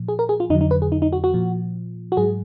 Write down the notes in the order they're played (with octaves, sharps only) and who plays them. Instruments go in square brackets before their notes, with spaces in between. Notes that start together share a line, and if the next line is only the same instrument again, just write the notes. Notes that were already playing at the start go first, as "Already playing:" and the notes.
Already playing: [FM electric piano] A#2 F3
G#4
A#4
G#4
F4
F2 D3 F#3 D#4
D#4
B4
G#4
D#4
D#4
F#4
F#4
A#2 F3
F#4
G#2 F#3 G#4